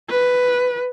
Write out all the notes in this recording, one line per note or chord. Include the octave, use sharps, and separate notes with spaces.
B4